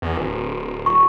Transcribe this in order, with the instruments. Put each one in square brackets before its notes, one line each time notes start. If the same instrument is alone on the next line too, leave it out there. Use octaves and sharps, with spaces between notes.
[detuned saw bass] E2
D1
[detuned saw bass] D#1 [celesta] C#6